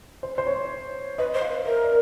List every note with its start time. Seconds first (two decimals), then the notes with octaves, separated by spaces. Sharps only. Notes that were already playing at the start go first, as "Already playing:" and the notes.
0.23 C5
0.38 C5
0.47 C#5
1.18 B4 D#5
1.34 C5
1.42 F5
1.50 B4
1.66 A#4 E5
1.84 D5